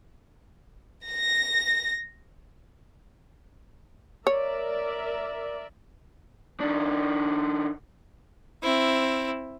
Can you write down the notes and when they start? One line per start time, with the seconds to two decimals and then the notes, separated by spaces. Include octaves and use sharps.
1.06 A#6
4.27 A#4 C#5 D5 E5
6.60 D#3 D4
8.63 C4 E4